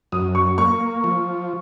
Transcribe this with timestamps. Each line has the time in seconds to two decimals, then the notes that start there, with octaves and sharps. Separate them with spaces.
0.12 F#2 D#6
0.35 C#6
0.58 A#3 C#6
1.04 F3